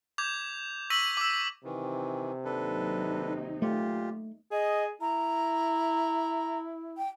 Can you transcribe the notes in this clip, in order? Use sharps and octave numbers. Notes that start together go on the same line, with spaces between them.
D6 G6 G#6 F7
C#6 E6 A#6 B6 D#7 F#7
D6 E6
C3 D#3 E3
D#2 F#3 D4 D#4 A4 B4
A#2 A3 F4 G4
G#4 D#5
E4 A#5
G5